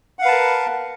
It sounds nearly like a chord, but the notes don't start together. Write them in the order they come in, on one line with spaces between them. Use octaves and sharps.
F#5 F5 B4 A5 A#4